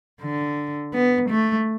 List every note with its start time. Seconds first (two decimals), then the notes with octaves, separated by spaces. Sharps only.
0.21 D3
0.93 B3
1.29 A3